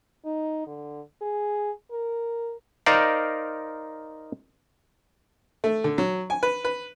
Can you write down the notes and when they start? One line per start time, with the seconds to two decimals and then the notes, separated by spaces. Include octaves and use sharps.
0.25 D#4
0.67 D3
1.22 G#4
1.91 A#4
2.86 D#4 A#4 C5 D5 F5
5.64 A3
5.84 D3
5.98 F#3
6.30 G#5
6.43 B4
6.65 B4